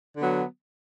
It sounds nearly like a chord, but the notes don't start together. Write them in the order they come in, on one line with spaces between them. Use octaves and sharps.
D3 B3 F#3